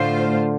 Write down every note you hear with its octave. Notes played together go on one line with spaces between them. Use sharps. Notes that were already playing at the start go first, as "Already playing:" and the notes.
Already playing: A2 D3 A3 F4 C5 F5